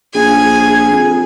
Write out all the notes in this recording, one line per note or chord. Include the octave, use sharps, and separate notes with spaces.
A#1 G#4 G#5
F2